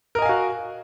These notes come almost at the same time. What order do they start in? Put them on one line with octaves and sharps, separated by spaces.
A#4 D#5 G#5 F5 F#4